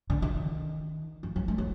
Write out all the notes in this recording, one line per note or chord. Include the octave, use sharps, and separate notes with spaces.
D3
D#3
F3
F#3
G#3
F#3